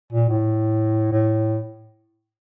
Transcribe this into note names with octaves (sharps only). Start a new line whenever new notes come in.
A#2
A2
A2